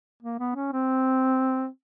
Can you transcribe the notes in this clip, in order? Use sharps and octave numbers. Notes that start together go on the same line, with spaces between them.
A#3
B3
C#4
C4